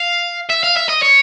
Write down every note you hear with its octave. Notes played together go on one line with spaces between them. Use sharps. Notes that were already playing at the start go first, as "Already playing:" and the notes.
Already playing: F5
E5
F5
E5
D#5
C#5